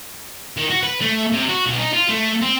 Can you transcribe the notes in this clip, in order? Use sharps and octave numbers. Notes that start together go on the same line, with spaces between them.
D#3
F#4
B4
A3
C3
F#4
B1
D#4
F4
A3
C4